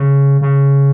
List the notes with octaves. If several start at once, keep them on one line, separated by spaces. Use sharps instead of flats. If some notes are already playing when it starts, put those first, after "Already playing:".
Already playing: C#3
C#3